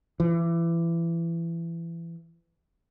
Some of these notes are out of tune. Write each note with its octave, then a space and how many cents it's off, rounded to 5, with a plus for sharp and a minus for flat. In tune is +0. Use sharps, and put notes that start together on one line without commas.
E3 +25